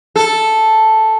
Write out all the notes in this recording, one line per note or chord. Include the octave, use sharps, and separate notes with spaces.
A4